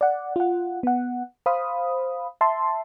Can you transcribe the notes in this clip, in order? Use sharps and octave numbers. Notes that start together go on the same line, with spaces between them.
D5 F#5
F4 F#5
B3 F#5
C5 F5 B5 D#6
E5 A5 C6